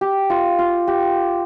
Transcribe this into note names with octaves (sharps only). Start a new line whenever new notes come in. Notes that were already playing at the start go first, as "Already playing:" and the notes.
G4
F4
F4
G4